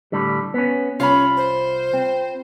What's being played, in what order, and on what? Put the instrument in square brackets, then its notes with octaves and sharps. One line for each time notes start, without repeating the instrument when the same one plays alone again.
[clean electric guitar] A2 D3 G3
B3 C#4
[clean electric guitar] C2 [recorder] C#4 [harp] F4 B5
[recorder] C5
[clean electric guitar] C4